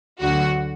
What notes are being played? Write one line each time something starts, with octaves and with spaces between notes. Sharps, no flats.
D2 D3 F#3 F#4